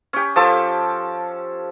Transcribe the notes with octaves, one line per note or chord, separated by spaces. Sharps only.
C#4 G4
F3 G4 A4 A5